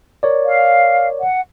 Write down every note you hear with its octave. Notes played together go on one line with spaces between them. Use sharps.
A#4 C#5 D5
F5
F#5